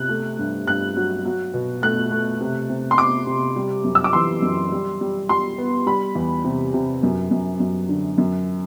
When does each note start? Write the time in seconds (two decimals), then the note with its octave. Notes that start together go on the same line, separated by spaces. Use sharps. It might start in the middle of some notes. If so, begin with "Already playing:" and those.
Already playing: C3 F#6
0.09 A3
0.39 G2
0.67 G2 F#6
0.96 F#3
1.25 F#3
1.54 B2
1.82 A3 F#6
2.11 A3
2.41 C3
2.69 C3
2.91 C6
2.98 C3 D6
3.27 C3
3.56 G3
3.84 F#2
3.95 E6
4.04 D6
4.13 E3 C6
4.42 F#2
4.72 G3
5.01 G3
5.29 G3 C6
5.58 B3
5.86 G3 B5
6.15 E2
6.44 C3
6.74 C3
7.03 F#2
7.31 F#2
7.60 F#2
7.89 D3
8.18 F#2